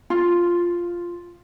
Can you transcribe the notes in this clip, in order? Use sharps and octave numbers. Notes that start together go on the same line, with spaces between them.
F4